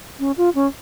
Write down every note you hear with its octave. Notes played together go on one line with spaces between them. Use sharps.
C#4
F4
C#4